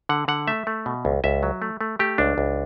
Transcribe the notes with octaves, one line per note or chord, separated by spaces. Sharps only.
D3 F#5
D3 F#5
A3 E5
A3
B2
C#2
C#2 E5
F#3
A3
A3
A3 G4
C#2 D4
C#2